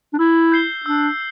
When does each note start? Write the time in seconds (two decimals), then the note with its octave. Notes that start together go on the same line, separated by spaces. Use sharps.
0.14 D4
0.19 E4 E6
0.52 G6 C7 G7
0.85 D4 E6